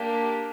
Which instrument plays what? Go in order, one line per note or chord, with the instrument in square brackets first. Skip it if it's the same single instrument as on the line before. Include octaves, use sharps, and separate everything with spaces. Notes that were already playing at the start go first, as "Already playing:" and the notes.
Already playing: [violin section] A#3 D4 G4